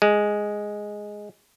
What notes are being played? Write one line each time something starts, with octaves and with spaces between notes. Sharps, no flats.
G#3